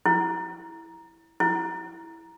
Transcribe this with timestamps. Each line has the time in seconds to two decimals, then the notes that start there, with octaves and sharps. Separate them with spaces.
0.06 E4
1.40 E4